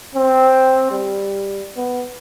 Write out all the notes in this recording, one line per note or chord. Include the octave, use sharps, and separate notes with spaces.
C4
G3
B3